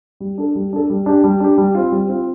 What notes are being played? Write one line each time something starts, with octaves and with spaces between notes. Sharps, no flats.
G3
D4 A4
G3
D4 A4
G3
D4 G4
G3
D4 G4
G3
C4 F4
G3
C4 F4